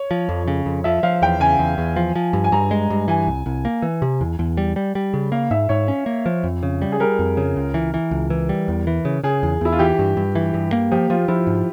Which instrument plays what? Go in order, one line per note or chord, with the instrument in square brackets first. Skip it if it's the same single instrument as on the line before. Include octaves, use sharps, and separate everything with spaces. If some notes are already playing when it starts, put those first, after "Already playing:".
Already playing: [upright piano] C#5
[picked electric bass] F3
F2
C#3
F2
[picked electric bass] F3 [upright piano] E5
[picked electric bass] F3 [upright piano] F5
[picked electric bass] E2 [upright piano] G5
[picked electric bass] C#3 [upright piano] G#5
[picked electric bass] E2
E2
F3
F3
G2
[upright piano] G#5
[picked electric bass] G2 [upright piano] A#5
[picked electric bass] G#3
G2
[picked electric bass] E3 [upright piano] G#5
[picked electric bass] C2
C2
A#3
E3
C3
E2
E2
G3
G3
G3
C#3
[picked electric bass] A#3 [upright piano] F5
[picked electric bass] G#2 [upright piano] E5
[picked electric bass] G#2 [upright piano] C#5
[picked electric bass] C#4
A#3
F3
F2
C#3
G3
[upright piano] G#4
[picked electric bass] G3 [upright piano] A#4
[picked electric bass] F2
C#3
C#2
E3
E3
C#2
E3
G3
E2
E3
C#3
[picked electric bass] C#3 [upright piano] G#4
[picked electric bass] E2
[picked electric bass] E2 [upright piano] E4
[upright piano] F4
[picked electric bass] E3 [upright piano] G4
[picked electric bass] G2
G2
E3
G2
A#3
[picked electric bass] F3 [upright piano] G4
[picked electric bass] F3 [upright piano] F4
[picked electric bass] F3 [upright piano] E4
[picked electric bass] G#2